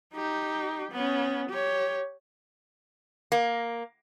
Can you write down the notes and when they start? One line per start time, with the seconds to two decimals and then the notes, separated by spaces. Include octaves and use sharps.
0.14 D#4 G4
0.92 B3 C#4
1.49 G4 C#5
3.32 A#3